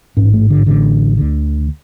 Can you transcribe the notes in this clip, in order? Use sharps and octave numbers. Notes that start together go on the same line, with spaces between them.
A1 G#2 C#4
A3
D3
A1 A2 D3
D2 D3